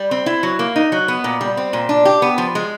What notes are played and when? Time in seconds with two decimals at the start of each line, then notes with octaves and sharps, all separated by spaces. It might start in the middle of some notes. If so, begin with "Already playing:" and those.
Already playing: G3
0.11 C4
0.26 E4
0.43 F#3
0.59 A#3
0.76 D#4
0.92 F#3
1.08 B3
1.24 A#2
1.41 G3
1.57 C4
1.73 A#2
1.89 D4
2.05 G4
2.22 B3
2.38 F3
2.55 G#3